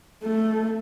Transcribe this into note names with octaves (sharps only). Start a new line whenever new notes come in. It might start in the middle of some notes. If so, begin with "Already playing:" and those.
A3